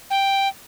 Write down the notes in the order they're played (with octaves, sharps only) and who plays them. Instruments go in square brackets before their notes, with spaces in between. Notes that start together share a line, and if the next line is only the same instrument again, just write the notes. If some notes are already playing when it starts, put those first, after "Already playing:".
[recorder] G5